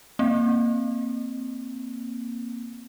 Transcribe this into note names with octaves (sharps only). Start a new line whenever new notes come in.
A#3 C4